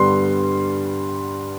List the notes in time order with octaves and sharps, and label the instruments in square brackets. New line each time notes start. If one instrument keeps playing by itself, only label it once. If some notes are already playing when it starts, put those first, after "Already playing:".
Already playing: [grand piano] G2 D3 G3 B3 C6